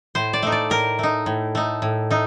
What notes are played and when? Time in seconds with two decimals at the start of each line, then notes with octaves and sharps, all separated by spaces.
0.15 A2 C5
0.33 D5
0.43 A3 D#4
0.52 D5
0.70 A2 A#4
0.99 A3 D#4
1.26 A2
1.55 A3 D#4
1.82 A2
2.10 A3 D#4